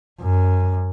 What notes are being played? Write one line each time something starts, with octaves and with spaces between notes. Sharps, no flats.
F#2